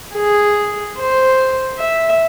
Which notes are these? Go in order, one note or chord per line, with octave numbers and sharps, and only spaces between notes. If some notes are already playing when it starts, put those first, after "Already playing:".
G#4
C5
E5